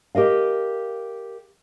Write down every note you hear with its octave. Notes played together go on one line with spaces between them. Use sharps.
G4 A#4 D#5 F5